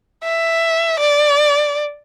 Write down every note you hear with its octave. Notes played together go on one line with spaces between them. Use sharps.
E5
D5